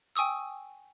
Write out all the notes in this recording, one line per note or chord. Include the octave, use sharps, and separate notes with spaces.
G5 G#5 C#6 D#6 E6